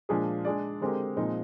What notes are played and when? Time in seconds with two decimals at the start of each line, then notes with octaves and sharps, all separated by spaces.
0.09 A#2 F3 G#3 D4 G#4
0.45 G#3 D4 G#4 D5
0.81 D3 G#3 C4 G4 A#4
1.17 A#2 F3 G#3 C4 D#4